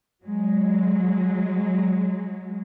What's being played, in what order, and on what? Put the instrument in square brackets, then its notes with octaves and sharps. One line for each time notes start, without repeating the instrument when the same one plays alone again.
[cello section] F#3 G#3